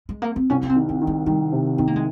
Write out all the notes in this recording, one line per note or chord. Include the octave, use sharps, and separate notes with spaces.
G#3
A#3
C4
C2 C#4
C#4
C4
D#3
C4
D#3
G#3
D#3 G3
C3
D#3 C4
A#3
G#3